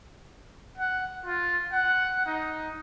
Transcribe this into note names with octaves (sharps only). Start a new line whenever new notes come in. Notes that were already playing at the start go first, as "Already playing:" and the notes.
F#5
F4
F#5
D#4